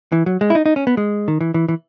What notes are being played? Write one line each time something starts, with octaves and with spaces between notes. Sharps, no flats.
E3
F#3
G#3
E4
D#4
D#4
C#4
B3
G#3
D#3
E3
E3
E3